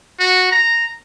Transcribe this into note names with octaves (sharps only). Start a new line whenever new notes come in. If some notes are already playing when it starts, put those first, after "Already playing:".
F#4
A#5